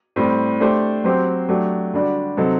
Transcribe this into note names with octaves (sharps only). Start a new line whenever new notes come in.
A2 G3 C4
A3 D4 G4 C5
F#3 C4 G4 C5
F#3 A3 D4 G4
D3 G3 D4 F#4
C3 F#3 C4 D#4 A4